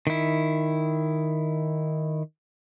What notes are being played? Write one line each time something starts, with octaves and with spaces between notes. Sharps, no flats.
D#3 E4